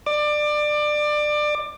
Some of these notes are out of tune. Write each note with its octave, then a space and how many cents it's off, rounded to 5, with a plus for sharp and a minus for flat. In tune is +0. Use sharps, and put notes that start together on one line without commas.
D5 +25 D6 +20